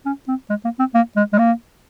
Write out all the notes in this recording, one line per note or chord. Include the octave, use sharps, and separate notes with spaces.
C#4
C4
G#3
A#3
C4
A#3
G#3
G#3
A#3